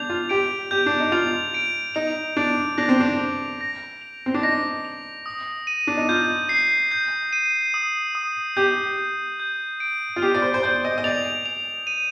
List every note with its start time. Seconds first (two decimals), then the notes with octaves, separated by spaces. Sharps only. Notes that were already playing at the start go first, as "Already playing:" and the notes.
Already playing: D4 G6 F7
0.09 F4
0.29 G4 D7
0.71 G4 G6
0.86 D4
1.00 D#4
1.12 F4 F7
1.54 D7
1.95 D#4 F7
2.37 D4 D7
2.78 D4 A#6
2.89 C4
3.00 D4
3.19 F7
3.61 A#6
4.01 F7
4.26 C4
4.34 D4
4.43 D#4 A#6
4.85 F7
5.26 D#6
5.67 D#7
5.87 D4
5.97 D#4
6.09 F4 G6
6.49 C7
6.91 G6
7.33 D#7
7.74 D#6
8.15 D#6
8.57 G4 G6
8.98 G6
9.40 G6
9.80 D7
10.16 F4
10.22 G4 G6
10.34 D5
10.42 C5
10.54 C5
10.63 D5 G6
10.85 D#5
10.98 D#5
11.04 D5 F7
11.46 F7
11.87 D#7